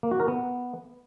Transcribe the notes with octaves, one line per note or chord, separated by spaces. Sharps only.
A#3
F#4
A#4
B3